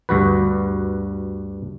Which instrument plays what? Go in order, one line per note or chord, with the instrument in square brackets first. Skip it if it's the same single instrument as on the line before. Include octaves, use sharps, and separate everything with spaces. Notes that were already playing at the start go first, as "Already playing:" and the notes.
[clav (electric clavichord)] D2 G2 F#4 B4